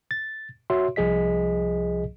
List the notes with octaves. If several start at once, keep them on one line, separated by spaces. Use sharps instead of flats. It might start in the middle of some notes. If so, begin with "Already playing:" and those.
A6
F#4 C#5 E5 C6
C2 F3 G#4 D#5 B6